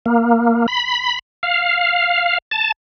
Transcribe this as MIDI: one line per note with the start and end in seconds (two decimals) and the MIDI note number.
0.06 0.66 58
0.68 1.19 83
1.43 2.38 77
2.51 2.72 81